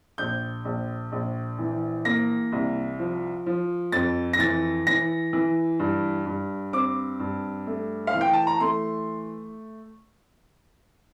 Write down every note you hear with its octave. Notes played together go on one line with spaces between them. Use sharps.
A#1 G6
A#1
A#1
E3
A#3 A#6
C2
F3
F3
F2 A6
A#6
E3 A6
E3 A#6
E3
G2
G2
C4 D6
G2
A3
F5
E3
G5
A5
A#5
A3 C6